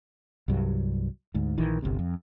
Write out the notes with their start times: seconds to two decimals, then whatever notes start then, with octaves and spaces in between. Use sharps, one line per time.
0.48 C2 G2 F#3
1.34 D2 G#2
1.58 A#1 D#3 E3
1.82 G1 C2 C3
1.99 F2